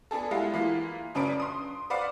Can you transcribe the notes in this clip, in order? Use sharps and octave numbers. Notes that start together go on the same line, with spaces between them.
B3 D4 G#4 A4
G3 G#3 E4 F4 F#5
E3 A#3 F4
F#2 C#3 C#4 D4 B4 D7
C6 D#6
B4 C5 D5 F5 F#5 D6